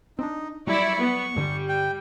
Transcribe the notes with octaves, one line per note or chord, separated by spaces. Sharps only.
C4 D4 D#4
F#3 G3 E4 D5 B5 C#6
B3
G2 D3 G3
G5